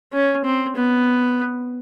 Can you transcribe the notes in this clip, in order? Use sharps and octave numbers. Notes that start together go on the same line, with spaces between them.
C#4
C4
B3